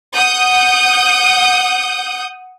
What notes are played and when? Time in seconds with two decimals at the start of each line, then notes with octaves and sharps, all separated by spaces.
0.15 F#5 D#6 G6